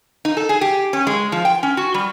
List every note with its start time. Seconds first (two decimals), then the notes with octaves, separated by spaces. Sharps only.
0.25 D#4
0.37 A4
0.49 G#4
0.61 G4
0.93 C#4
1.07 G#3
1.32 F3
1.45 G5
1.63 C#4
1.77 F#4
1.94 G3